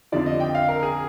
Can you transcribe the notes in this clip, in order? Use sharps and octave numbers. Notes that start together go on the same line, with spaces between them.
F2 D3 F3 D5
D#5
G5
F5
A#4
G#4